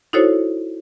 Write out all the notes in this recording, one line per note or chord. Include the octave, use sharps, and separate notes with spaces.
D#4 E4 F#4 A4 C5 C#5